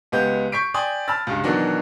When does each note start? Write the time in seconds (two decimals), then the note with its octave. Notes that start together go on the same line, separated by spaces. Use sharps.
0.12 C#2 G#3 B3 G4 G6
0.52 C#6 G6 B6 C7 D7
0.74 D5 G5 G#5 C6 D#6
1.08 A5 B5 E6 F6 A6
1.27 C#2 G2
1.44 B2 D#3 E3 F#3 D4 F#4